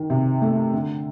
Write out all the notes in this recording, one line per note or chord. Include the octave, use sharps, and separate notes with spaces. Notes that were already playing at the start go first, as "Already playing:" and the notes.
Already playing: D#3
C3
A3
D3